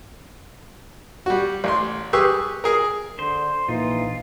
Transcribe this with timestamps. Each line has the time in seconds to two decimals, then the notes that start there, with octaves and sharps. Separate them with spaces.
1.26 G3 F#4
1.64 A1 C6
2.13 G4 G#4 B4 C#6 E6
2.64 G#4 A#4
3.19 D3 C5 C6
3.69 A#1 E3 D#4 F4